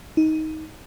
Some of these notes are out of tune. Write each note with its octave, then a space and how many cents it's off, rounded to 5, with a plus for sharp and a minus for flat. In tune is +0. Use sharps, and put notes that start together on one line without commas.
D#4 +15